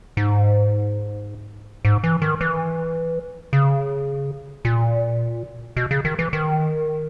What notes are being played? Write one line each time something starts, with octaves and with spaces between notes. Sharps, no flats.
G#2
G#2
E3
D#3
E3
C#3
A#2
B2
C#3
D#3
E3
D#3